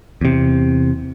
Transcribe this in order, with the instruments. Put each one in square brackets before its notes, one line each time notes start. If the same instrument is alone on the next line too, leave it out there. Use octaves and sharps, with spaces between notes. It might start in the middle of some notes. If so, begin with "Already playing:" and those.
[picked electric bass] E2 C3